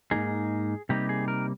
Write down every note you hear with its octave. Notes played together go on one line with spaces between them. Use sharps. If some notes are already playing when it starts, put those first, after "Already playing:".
G#2 F3 A#3 D#4 G#4
C3 G3 A#3 D#4 G4
G#4
A#4